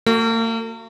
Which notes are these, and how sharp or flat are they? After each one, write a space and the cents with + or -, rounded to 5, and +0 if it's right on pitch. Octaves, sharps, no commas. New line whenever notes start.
A#3 -45 F#4 +0